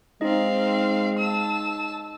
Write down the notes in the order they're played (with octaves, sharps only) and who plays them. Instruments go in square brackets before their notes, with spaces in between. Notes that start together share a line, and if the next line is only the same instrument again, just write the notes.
[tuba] G#3 [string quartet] C4 F5 [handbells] D#4 D#5
[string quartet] A5 E6